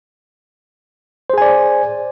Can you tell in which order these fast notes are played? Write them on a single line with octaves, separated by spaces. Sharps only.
C5 G#4 G#5 D5